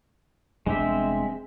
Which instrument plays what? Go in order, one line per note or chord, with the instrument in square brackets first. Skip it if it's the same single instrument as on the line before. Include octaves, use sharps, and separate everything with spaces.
[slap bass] E1 G3 D4 [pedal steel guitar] G#3 C4 E5